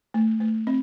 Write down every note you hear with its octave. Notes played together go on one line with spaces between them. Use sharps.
A3
A3
C4